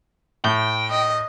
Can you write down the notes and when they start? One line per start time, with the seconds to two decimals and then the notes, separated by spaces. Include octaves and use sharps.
0.44 A2 G5
0.91 D#5